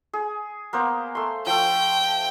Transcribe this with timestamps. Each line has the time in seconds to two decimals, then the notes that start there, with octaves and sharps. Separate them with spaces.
0.13 G#4
0.73 A#3 B3 C5
1.15 A3 C6
1.46 F3 A3 G5